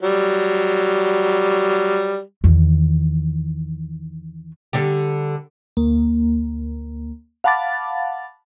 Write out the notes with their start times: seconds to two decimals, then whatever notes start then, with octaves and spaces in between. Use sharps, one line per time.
0.02 F#3 G3
2.44 E2 D#3
4.73 D3 G3 G4
5.77 D2 A#3
7.44 F5 F#5 A5 B5 D6 A6